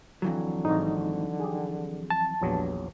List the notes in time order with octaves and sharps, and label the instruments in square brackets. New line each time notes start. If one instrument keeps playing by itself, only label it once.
[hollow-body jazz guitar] F2 E3 F#3 [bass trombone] D3
[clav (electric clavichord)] G#1 G#2 [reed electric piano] D#4
[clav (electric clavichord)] G4 G#4
[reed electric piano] A5
[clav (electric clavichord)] A#1 E2 F#3 [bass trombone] G2